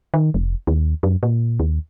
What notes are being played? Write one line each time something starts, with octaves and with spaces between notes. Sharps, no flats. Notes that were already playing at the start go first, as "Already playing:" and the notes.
D#3
F1
D#2
F#2
A#2
D#2